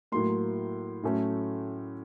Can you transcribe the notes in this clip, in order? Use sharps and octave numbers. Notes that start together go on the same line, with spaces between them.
A2 F#3 A#3 C6
A2 F#3 A3 C#4